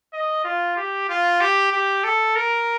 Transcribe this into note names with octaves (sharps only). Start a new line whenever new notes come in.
D#5
F4
G4
F4
G4
G4
A4
A#4